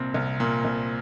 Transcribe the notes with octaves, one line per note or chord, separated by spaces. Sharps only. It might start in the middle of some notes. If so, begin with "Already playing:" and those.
Already playing: C2 A#2 C4
C2
A#2
C2